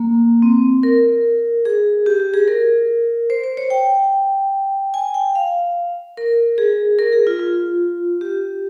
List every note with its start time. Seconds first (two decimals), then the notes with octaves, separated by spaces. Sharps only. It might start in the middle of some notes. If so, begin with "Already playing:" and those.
Already playing: A#3
0.42 C4
0.83 A#4
1.65 G#4
2.06 G4
2.20 G4
2.34 G#4
2.48 A#4
3.30 C5
3.44 C5
3.57 C#5
3.70 G5
4.94 G#5
5.14 G5
5.35 F5
6.17 A#4
6.58 G#4
6.99 A#4
7.13 G#4
7.27 F4
7.39 F4
8.21 G4